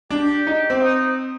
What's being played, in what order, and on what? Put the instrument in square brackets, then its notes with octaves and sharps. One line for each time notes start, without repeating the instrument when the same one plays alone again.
[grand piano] D4 [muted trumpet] G4
[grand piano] D#4
C4
[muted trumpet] D#4